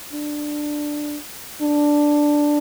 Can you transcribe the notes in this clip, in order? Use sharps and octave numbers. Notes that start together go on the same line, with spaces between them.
D4
D4